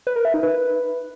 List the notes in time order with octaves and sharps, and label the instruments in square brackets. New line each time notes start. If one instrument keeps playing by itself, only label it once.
[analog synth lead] B4
A#4
E5
D#4
B4